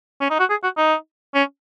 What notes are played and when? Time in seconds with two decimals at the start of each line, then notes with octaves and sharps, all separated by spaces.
0.21 C#4
0.30 D#4
0.40 F#4
0.50 G#4
0.64 F#4
0.78 D#4
1.35 C#4